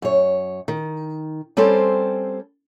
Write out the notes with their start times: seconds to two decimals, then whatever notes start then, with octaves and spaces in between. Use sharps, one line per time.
0.02 F#2 C#5
0.68 D#3
1.57 G3 C4 C#4 A4 C5